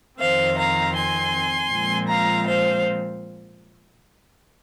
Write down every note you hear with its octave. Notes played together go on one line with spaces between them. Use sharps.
F2 D#3 C4 C5 F5
F5 A#5
G#5 C6
A#2 F3 G#3 C4
F5 A#5
C5 F5